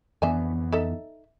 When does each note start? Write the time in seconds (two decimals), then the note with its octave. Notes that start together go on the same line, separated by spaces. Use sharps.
0.22 F2 E3 B3 D4 E5 G#5
0.72 D#4 A4 E5